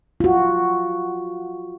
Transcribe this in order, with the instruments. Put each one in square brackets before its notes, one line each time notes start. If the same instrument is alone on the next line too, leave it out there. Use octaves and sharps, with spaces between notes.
[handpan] F4 F#4